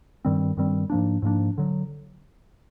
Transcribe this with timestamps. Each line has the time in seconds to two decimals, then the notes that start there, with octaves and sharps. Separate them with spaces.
0.25 G2 D#3 G3 C4
0.57 G2 D#3 G3 C4
0.90 G#2 F3 A#3 D4
1.22 G#2 F3 A#3 D4
1.58 D3 F#3